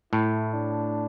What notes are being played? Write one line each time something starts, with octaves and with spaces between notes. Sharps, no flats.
A2 E4
D4